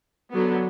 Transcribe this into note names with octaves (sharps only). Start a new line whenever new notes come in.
D3 F#3 B3